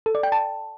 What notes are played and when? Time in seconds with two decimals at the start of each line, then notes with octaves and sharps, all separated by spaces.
0.06 A4
0.15 D5
0.23 G5
0.32 A5